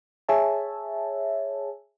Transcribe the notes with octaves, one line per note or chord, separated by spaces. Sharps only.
G#4 C#5 E5 G#5 A5